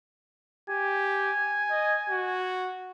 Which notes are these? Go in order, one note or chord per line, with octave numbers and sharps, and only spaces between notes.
G4 G#5
D#5
F#4